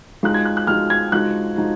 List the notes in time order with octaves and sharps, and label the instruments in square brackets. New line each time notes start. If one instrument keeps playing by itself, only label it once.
[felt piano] F3 G#3 D#4 F#4 [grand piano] F#6
[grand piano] G#6
F#6
F#6
[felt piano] F3 G#3 D#4 F#4 [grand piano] F6
[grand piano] G#6
[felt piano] F3 G#3 D#4 F#4 [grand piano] F#6
[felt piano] F3 G#3 D#4 F#4